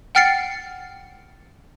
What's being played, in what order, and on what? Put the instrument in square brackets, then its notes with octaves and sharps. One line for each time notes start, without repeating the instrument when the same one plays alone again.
[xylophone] F#5 G5 F6 A6 C7 C#7